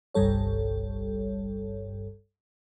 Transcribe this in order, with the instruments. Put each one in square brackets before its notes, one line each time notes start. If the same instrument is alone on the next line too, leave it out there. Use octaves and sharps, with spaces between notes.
[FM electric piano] G1 C2 G2 G3 A4 C#5